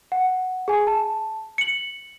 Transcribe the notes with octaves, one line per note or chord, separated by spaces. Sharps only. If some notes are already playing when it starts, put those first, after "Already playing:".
F#5
G#4 G#5
A5
C#7 F#7